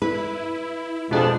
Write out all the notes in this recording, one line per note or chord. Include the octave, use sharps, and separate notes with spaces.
E4 B4
F2 B2 G#3 D4